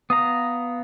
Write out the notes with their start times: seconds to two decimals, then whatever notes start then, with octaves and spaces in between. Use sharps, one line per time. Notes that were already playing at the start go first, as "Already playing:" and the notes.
0.10 B3 F5 A#5 D#6